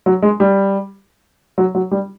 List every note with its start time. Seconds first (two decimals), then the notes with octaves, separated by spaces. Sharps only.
0.06 F#3
0.22 G#3
0.40 G3
1.58 F#3
1.75 F#3
1.91 G3